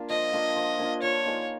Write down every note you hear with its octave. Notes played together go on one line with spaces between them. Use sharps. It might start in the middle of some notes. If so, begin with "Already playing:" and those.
Already playing: A#3 D4 F4
F3 D#5
A#3 D4 F4
F3
A#3 D4 F4
F3 C#5
A#3 D#4 G#4